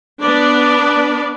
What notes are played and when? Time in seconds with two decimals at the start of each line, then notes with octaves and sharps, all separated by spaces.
0.22 B3 D4 B4 D5